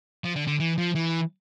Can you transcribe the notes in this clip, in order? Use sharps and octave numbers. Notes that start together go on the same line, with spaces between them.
F3
D3
D3
E3
F3
E3